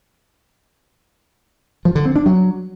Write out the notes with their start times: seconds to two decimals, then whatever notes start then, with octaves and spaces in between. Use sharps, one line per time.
1.85 F3
1.95 D3
2.06 C4
2.16 D4
2.26 F#3